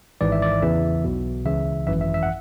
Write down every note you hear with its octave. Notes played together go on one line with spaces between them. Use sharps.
G#1 G#2 E3 D5
E5
D5
E2 C#3 E3 E5
B1 B2
C#2 C#3 E3 E5
G#1 F#2 E3 E5
E5
E5
F#5